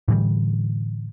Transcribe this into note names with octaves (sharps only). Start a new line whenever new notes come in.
A2 D3 E3 G3